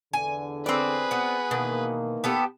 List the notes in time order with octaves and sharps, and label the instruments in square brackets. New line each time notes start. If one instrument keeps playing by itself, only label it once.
[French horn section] E2 D3 [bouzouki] G#5
[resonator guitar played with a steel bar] C4 D5 [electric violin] G#4 B4
[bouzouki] B3 F#4
[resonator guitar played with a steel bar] B2 [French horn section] D#3 E3 A#3
[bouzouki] B3 G4 A4